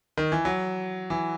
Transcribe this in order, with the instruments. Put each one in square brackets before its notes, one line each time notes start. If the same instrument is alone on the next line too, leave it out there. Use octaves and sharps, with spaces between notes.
[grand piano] D#3
E3
F#3
E3